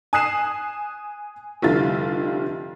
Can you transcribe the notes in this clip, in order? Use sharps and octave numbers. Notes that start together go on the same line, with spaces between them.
G#5 D#6 F#6 C7 E7
F1 D3 G3 E4 F4 A6